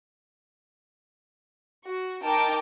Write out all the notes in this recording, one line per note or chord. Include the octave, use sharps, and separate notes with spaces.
F#4
D#4 A#4 G5 A5 D6 D7